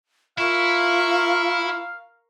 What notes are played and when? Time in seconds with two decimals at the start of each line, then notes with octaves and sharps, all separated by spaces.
0.38 E4 F4 A#4 F5 C#6